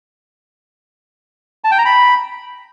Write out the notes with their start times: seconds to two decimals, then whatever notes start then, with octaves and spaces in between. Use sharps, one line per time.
1.64 A5
1.71 G5
1.78 A#5
1.85 B5